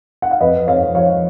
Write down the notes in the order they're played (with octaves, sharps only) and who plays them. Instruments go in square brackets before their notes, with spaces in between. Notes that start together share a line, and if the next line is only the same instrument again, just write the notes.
[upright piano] F#5
F5
F2 B4 D#5
F2 C#5 F5
F3 C#5 F5